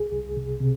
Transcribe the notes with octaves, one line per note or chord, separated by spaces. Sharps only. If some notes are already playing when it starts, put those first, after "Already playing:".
Already playing: C2 G#4
C2
C3
C3